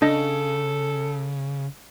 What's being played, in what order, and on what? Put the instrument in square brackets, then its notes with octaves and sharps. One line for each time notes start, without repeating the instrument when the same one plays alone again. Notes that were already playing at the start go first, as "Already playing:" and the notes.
[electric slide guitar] C#3 [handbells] D4 D#5 [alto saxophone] A4